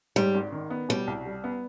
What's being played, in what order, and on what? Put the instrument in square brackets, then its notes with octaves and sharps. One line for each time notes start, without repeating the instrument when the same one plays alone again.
[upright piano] G#2 [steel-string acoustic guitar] G3
[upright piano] G#1
D#3
B3
[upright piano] B2 [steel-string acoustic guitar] G3
[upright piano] C2
G3
B3